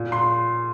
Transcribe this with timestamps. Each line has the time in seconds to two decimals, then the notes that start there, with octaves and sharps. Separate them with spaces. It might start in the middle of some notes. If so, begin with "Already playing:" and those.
Already playing: A#2
0.12 C6